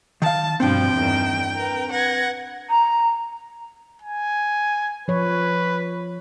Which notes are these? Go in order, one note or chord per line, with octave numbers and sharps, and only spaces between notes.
D#3 F5 A5
G2 B2 F3 C4 D4 G5
E2 G2 D#3
A#4 B4
B4 F#5 G#6 A#6
A#5
G#5
F3 B4 C#5